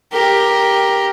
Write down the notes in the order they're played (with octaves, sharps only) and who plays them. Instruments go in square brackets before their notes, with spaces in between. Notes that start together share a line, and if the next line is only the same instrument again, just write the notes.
[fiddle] G4 A#4